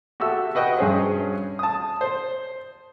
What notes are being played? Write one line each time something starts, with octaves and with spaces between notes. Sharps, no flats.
F#4 G4 A4 E5 E6
F#4 B4 D#5 G5
G2 C#4 G#4 C5
A5 D#6
C5